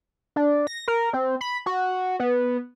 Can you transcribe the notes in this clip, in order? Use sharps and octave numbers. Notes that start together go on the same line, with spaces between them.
D4
A#6
A#4
C4
B5
F#4
B3